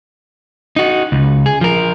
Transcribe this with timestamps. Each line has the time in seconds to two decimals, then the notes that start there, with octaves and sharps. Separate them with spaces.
0.76 D#4 F#4
1.12 C#2
1.46 G#4
1.61 F3 A#4